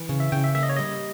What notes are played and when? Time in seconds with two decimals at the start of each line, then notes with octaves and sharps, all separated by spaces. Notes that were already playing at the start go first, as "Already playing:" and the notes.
Already playing: E3
0.09 C#3
0.20 E5
0.32 C#3 G5
0.44 E5
0.55 A#3 E5
0.63 D#5
0.69 C#5
0.76 G3 D#5